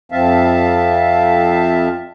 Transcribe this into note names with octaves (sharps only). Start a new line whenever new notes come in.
F2 F3 C4 E5 F5 A5